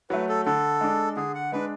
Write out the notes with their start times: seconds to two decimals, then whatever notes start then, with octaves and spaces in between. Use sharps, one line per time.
0.10 F#3 A3 B4
0.29 A4
0.45 D3 A4
0.81 G#3 D4
1.16 D3 G#4
1.35 F#5
1.52 G#3 D4 B4